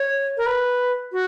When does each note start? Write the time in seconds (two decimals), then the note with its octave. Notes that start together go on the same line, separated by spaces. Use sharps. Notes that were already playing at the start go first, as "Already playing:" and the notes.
Already playing: C#5
0.37 A#4
0.46 B4
1.12 F#4